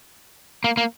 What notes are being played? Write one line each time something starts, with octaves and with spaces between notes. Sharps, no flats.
A#3
A#3